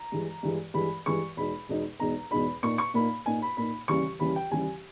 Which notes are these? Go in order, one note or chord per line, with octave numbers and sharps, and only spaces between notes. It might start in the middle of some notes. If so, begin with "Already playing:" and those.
Already playing: A#5
G2 E3 G#3
G2 E3 G#3
G2 E3 G#3 B5
G2 E3 G#3 C#6
E2 B2 G#3 D#4 B5
E2 B2 G#3 D#4
E2 B2 G#3 D#4 A#5
E2 B2 G#3 D#4 B5
A#2 A#3 D#4 C#6
C#6
A#2 A#3 D#4 B5
A#2 A#3 D#4 G#5
B5
A#2 A#3 D#4 B5
D#2 C#3 E3 G3 C#6
D#2 C#3 E3 G3 B5
G5
D#2 C#3 E3 G3 G#5